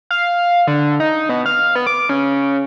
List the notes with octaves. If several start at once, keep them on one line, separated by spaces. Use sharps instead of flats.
F5
D3
D#4
B2
F5
B3
D6
C#3